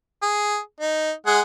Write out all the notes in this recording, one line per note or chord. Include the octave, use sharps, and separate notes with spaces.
G#4
D#4
G#3 G#4 F#5